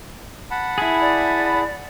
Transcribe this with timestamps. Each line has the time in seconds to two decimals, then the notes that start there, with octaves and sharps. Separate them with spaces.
0.51 F#5 A5 B5
0.78 E4 G#4
1.01 D5